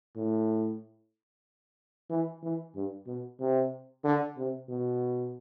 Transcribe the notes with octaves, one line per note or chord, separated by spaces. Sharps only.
A2
E3
E3
G2
B2
C3
D3
C3
B2